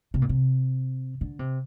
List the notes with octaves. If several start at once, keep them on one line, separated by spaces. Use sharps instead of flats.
C3
A#2
C3
D3
C3